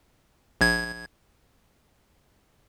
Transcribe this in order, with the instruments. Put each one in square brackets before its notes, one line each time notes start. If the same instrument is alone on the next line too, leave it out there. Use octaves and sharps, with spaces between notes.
[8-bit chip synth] A#1 G#6